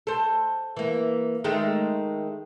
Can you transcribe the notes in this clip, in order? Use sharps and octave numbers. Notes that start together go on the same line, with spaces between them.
A4 C5
E3 A#3
D#3 G#3 A3